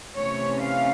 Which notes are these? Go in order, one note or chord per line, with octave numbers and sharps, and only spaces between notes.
C3 E3 A3 C#4 C#5
F5